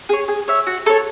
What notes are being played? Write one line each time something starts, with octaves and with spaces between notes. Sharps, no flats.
G#4 C#5
G#4
C#5 E5
F#4
A4 C#5